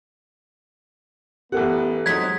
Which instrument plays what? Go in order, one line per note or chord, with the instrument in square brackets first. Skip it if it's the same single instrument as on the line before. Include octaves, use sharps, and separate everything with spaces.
[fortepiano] A1 F#5 [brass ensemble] B3 [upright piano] G4 A4
[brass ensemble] F2 [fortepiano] F#3 G#3 D#4 [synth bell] G#6 B6